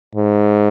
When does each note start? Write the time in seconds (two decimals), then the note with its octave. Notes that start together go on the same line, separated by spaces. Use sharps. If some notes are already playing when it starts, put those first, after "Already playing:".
0.15 G#2